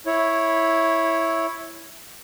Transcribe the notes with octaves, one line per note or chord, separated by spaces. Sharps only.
E4 C#5